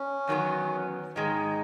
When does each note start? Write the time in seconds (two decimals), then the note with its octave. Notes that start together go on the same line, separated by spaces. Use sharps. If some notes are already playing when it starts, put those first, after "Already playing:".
Already playing: C#4
0.27 E2 D#3 F#3 B3
1.16 G#2 D#3 G#3 D#4